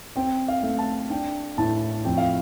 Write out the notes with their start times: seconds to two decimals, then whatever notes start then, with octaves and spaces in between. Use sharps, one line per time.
0.16 C4 G5
0.48 F5
0.63 A3
0.78 A5
1.10 D4 G5
1.58 A2 A5
2.05 F2 G5
2.17 F5